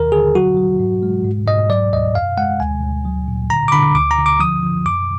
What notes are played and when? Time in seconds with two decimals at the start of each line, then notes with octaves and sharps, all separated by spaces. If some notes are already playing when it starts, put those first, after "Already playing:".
Already playing: D#2 D#3 A#4
0.12 D3 G#4
0.35 F#3 F#4
0.57 F#3
0.79 G#2
1.03 G#3
1.25 G#2
1.47 G#2 D#5
1.69 F#3 D5
1.92 D2 D#5
2.15 F#2 F5
2.37 G#3 F#5
2.60 D2 G#5
2.83 D2
3.05 F#3
3.28 A#2
3.50 D3 A#5
3.68 D6
3.72 D3 B5
3.95 D2 D6
4.11 A#5
4.18 D3
4.26 D6
4.40 F3 D#6
4.63 F3
4.86 F#2 D6